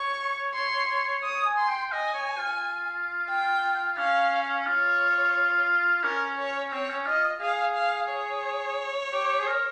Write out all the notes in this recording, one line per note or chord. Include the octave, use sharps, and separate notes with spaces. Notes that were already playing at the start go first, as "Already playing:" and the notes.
Already playing: C#5 C#6
C6
C#5 D#6
G#5
C6
G5
D#5 G#5
C#5
F4
G5
C#4 F5
F4 C#5
C#4 A#4
C#5
C4 C#5
C#4
F4 D#5
G#4 F5
F5
C#5
G4
G#4
A#4